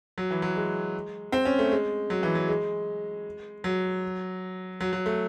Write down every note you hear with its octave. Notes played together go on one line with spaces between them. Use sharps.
F#3
E3
F#3
G#3
C4
C#4
A3
G#3
F#3
E3
F#3
G#3
F#3
F#3
F#3
A3